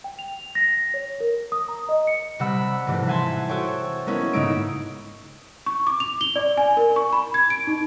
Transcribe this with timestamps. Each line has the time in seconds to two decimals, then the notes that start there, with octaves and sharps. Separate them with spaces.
0.04 G5
0.19 F7
0.55 A#6
0.94 C#5
1.20 A#4
1.52 D#6
1.68 A#5
1.89 D#5
2.07 C#7
2.39 C3 G3 F#5 B5 E6 F#6
2.87 G#2 C3 E3 F3 A3
3.07 E5 F#5 G#5 A5 C6 G#6
3.49 F#4 A4 C5 C#5 G5
4.06 G#3 A#3 B3 C#4 E4 A4
4.33 G#2 C#3 G#3 D#4 E6 D7
5.66 C#6
5.87 D6
6.00 F7
6.21 G7
6.36 D5
6.58 G#5
6.77 A#4
6.96 C#6
7.13 B5
7.34 G#6
7.50 D7
7.67 D#4